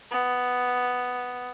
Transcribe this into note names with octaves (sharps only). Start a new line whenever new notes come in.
B3